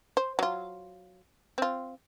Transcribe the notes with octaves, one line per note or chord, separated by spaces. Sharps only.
C5
F#3 F4
C4 F4